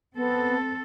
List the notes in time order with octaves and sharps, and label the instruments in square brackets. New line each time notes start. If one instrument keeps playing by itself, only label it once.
[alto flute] B3 [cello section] C4 A4